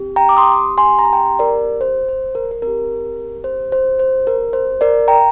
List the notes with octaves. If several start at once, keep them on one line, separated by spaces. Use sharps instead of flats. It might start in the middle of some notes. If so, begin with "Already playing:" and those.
Already playing: C4 G4
G5 A#5
D6
C6 D#6
G#5 C6
A#5
C6
G5 A#5
A#4 D5
C5
C5
A#4
A#4
C4 G4 A#4
C5
C5
C5
A#4
C5
A#4 D5
G5 A#5